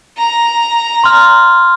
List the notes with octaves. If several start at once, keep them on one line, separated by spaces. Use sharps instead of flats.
A#5
C6 F6